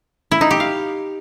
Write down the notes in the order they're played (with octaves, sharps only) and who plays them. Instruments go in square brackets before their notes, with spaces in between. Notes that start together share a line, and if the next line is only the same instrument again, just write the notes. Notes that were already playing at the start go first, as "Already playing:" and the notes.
[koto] E4
D#4
G4
F5